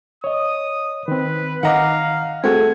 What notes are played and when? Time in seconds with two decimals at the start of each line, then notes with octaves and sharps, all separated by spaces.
0.24 C#5 D#5 D#6
1.08 D#3 C4 B4
1.63 D#3 D#5 F5 F#5 A#5 D6
2.44 A3 C4 F#4 G#4 G#6